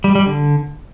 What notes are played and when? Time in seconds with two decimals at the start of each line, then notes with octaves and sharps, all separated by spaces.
0.04 G3
0.15 G3
0.26 D3